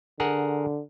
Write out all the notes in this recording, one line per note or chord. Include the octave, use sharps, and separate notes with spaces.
D3 G#4 A#4 F#5